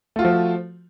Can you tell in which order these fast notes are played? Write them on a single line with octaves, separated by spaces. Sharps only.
A3 F4 F#4 F3